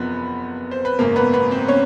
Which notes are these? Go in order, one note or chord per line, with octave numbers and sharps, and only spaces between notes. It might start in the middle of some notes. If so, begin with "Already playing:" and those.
Already playing: F#1 E2 C3 F3 B3 B4
C5
B4
G#1 F#2 C#3 A#3 A#4
B3 B4
B3 B4
C4 C5
C#4 C#5